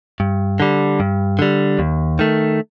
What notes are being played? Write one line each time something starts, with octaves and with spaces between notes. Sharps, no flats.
G2
D3 G3
G2
D3 G3
D#2
D#3 A3